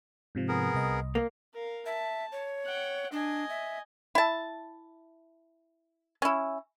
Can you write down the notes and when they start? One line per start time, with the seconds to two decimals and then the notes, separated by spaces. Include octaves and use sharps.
0.35 G#2 C3 F3
0.48 B3 G#4 A#4
0.74 C2 D#5
1.15 A#3
1.53 A#4 F5
1.86 E5 A5
2.32 C#5
2.64 F#5 G5
3.12 D4 D#5 G#5
3.49 E5
4.15 E4 A5
6.22 C#4 E4